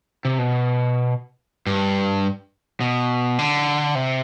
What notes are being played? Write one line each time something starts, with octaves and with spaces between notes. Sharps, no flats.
C3
B2
G2
B2
D3
C3